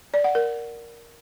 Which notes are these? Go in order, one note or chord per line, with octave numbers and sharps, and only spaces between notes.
D5
F#5
A#4